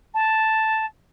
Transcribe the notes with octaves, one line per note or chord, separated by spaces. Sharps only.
A5